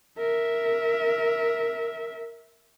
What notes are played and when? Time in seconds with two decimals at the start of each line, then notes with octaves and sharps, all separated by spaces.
0.18 A#4 E5